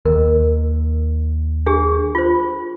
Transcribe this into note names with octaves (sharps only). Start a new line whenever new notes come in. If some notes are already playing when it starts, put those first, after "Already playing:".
D#2 A#4
D4 G4 G#4
F4 C5